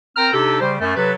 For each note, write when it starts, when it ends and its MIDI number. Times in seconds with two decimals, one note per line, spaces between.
0.17 0.29 60
0.17 0.29 70
0.17 0.29 79
0.17 0.29 82
0.17 0.29 89
0.33 0.58 48
0.33 0.58 62
0.33 0.58 63
0.33 0.58 67
0.33 0.58 69
0.61 0.74 49
0.61 0.74 55
0.61 0.74 67
0.61 0.74 72
0.79 0.94 42
0.79 0.94 57
0.96 1.12 48
0.96 1.12 54
0.96 1.12 69
0.96 1.12 71